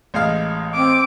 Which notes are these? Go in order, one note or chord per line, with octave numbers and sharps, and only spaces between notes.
A1 G#3 F5
C4 D6